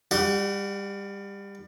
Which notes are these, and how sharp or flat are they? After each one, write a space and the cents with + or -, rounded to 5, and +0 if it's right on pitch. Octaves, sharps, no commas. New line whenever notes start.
G3 +25 G4 -40 F#5 +0